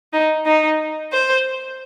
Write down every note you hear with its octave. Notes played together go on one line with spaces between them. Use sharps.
D#4
D#4
C5